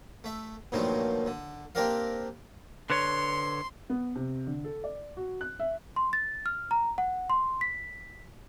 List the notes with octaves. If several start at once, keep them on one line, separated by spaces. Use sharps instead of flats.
A3 E5
G2 A#2 D#3 F3 F#3 A3
D3
A#3 C4 D4 G4 A#4 F5
D3 B4 C#5 C6
B3
C3
D3
A4
D5
F#4
F#6
E5
C6
A6
F6
A#5
F#5
C6
B6